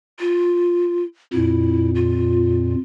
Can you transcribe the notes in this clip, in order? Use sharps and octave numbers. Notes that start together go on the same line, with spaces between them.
F4
F2 A#2 E4
F4